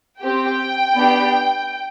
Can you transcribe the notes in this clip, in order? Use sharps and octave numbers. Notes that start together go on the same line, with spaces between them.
C4 G4 G5
B3 D4 G4